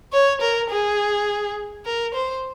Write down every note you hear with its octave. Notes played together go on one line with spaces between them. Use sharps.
C#5
A#4
G#4
A#4
C5